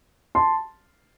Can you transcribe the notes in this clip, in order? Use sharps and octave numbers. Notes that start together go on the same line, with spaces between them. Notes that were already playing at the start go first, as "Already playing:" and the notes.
A5 C6